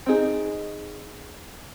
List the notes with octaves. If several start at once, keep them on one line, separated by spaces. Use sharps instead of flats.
C4 D#4 G#4